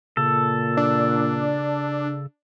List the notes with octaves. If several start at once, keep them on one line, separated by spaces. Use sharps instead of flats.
A#2 C#3 A4
D4